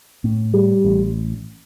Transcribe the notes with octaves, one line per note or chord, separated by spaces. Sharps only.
A2
G3
A1